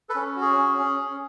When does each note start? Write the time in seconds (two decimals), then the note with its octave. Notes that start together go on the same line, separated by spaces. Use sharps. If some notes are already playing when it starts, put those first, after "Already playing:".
0.09 A4 B4
0.15 C#4
0.36 F#4
0.41 G#4
0.57 C#4
0.78 C#4
0.99 C#4